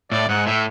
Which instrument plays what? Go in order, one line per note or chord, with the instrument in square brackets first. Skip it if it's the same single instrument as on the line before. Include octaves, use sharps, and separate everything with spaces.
[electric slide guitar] A2 [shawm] D5
[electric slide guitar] G#2 [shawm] F#5
[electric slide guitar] A2 [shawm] E5